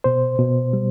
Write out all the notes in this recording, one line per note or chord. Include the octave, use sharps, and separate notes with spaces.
B2 C5
B2
G3